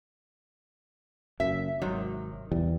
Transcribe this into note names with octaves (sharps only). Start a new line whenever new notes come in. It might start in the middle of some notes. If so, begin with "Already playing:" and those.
F#1 F#2 E5
G#1 C3 D#3 F#3
E2 E3 G3